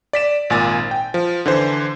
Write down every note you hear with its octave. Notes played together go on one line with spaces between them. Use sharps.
D5 B6 E7
G#1 A#2 G#5 A6
G5
F3
D3 E3 C5